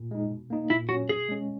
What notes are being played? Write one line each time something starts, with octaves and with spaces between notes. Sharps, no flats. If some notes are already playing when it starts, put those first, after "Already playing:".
Already playing: A#2
G#3 D#4
B2
A#3 D#4
A#2 E4
F#3 C#4 F#4
B2 G#4
G#3 C#4